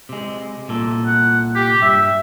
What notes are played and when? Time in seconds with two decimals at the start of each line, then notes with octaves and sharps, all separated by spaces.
0.09 C3 G#3
0.68 C2 A#2 A4
1.06 F#5
1.55 G4
1.82 G2 E5